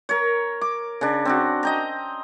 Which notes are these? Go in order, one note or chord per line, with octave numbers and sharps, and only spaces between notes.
A#4 C#5
D6
C#3 D4
C4 D4 F#4
D#5 G5 A#5